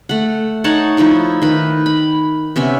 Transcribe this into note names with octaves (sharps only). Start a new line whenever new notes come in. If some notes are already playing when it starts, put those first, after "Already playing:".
A3 F#5
D#4 C#5 F#5 A5
F3 D#4 E4 C#6
D#3 B4
B5
C3 B3 C#4 E5